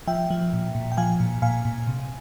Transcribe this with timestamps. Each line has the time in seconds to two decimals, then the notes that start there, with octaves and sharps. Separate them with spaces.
0.07 F3 E5 G5
0.30 F3
0.53 A#2
0.75 A#2
0.92 G5
0.97 F3 F5 G#5
1.20 A#2
1.42 A#2 F5 G#5
1.65 A#2
1.87 C3